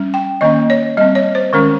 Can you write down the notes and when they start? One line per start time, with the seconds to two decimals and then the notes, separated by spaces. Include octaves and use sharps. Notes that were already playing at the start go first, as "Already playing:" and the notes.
Already playing: G3 C#4
0.14 G5
0.41 D#3 A#3 C#4 D#5
0.70 C#5
0.97 G3 D#5
1.01 C4
1.15 C#5
1.35 C5
1.53 D#3 G#3 C#4 A#4